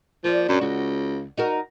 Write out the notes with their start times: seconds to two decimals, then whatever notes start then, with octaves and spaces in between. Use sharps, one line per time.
0.24 F3 A#3 D5
0.49 F#2 F#3 D4
0.61 C#2 F#4
1.37 D#4 F#4 A#4